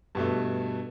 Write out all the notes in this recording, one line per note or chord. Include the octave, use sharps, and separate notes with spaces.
G2 B2 A3